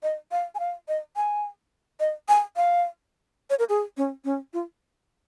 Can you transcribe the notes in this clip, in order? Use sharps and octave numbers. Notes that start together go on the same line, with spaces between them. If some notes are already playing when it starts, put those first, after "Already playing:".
D#5
F5
G#5
F5
D#5
G#5
D#5
G#5
F5
C#5
A#4
G#4
C#4
C#4
F4